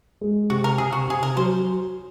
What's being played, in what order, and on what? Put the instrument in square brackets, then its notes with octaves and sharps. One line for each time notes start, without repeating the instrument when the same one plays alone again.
[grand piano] G#3
[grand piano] C3 [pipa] F#4
[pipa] A#4
[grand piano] C3 [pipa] G#4
[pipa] F#4
[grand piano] C3 [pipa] G#4
[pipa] A#4
[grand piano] F#3 [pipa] C5